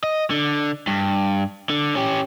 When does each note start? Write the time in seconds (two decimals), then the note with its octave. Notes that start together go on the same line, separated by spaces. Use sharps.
0.04 D#5
0.31 D3
0.87 G2
1.69 D3
1.95 C#4 G4